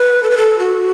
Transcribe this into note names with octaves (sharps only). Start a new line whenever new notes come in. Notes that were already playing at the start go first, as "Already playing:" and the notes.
Already playing: B4
A4
B4
A4
F#4